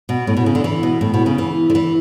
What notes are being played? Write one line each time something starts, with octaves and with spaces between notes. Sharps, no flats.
B2
A2
B2
C#3
D3
E3
B2
A2
B2
C#3
E3
D3
E3